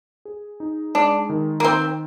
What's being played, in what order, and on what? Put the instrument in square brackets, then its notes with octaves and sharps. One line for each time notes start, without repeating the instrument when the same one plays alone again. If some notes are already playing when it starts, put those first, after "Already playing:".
[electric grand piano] G#4
D#4
[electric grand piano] G#3 [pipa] D4
[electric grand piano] D#3
[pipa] A#3
[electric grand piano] D#3 [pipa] C4